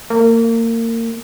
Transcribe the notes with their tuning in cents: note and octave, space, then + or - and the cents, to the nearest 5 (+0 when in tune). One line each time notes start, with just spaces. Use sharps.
A#3 -30